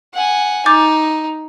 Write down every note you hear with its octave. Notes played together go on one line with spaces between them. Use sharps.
F#5 G#5
D#4 D6 G6 A6